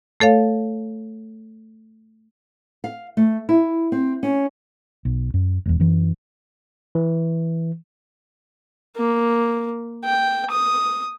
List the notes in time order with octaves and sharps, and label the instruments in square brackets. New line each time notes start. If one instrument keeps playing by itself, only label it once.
[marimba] A3 A4 C#5 F5
[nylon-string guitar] F5
A3
E4
C4
C#4
[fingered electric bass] B1
F#2
E1 E2
F#2 E3
[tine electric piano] E3
[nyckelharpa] A#3
G5
D#6